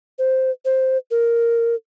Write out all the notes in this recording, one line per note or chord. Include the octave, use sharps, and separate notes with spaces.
C5
C5
A#4